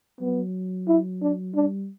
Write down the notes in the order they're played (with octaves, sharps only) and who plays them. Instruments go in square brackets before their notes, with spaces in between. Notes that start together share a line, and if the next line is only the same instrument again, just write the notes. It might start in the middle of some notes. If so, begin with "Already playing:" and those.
[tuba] F#3 [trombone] B3
[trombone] E4
D4
[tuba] G3 [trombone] D4